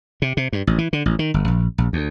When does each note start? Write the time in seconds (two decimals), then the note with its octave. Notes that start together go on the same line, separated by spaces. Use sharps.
0.22 C3
0.37 C3
0.53 G2
0.67 A1
0.78 E3
0.93 D3
1.06 A1
1.19 D#3
1.34 G1
1.48 A#1
1.78 A#1
1.93 D2